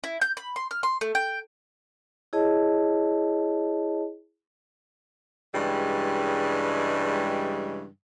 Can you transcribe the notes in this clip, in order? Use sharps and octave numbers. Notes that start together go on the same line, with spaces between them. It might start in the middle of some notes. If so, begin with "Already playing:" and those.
E4
G6
B5
C6
F6
C6
A3
G5
E4 G#4 C#5 D#5 A5
G2 C#3 E3 G3 G#3